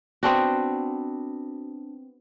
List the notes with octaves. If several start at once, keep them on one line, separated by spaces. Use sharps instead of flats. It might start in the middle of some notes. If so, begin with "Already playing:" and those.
B3 C4 D4 F#4